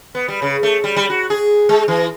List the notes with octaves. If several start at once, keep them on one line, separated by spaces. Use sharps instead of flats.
B3
G3
C#3
A3
G3
G3
F#4
G#4
G#3
E3